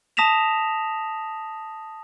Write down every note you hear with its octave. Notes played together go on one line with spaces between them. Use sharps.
A5 D#6 A#6 B6 E7 F7